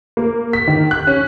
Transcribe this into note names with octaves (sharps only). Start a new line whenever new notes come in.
A#3
B6
D#3
F#6
C#4